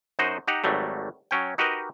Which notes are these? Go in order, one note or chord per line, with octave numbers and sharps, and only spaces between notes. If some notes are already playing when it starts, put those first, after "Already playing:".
F#2 D#4 F#4 C5 D#5
D#4 G4 F#5 A#5
G#1 F#3 G3 A3
F#3 C#4 G5
D#4 F#4 G4 A#4 B4 D#5